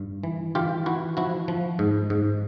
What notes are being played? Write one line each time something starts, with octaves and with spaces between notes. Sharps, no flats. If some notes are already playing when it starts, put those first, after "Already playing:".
Already playing: G2
E3
E3 F4 G4
E3 E4 F#4
F3 E4 F#4
F3
G#2
G#2